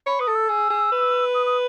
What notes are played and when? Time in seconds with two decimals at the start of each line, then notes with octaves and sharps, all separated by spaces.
0.06 C#5 B5
0.20 B4 D#6
0.28 A4
0.35 E6
0.49 G#4
0.70 G#4
0.92 B4
1.34 D#6
1.46 D#6